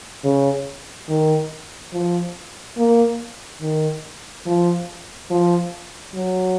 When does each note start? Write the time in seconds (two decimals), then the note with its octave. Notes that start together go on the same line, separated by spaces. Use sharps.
0.24 C#3
1.09 D#3
1.93 F3
2.77 A#3
3.62 D#3
4.46 F3
5.30 F3
6.15 F#3